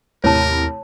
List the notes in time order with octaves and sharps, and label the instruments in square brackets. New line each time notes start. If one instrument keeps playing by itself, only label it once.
[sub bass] D#2 [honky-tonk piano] A2 C3 [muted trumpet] A#4 [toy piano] C#5 A5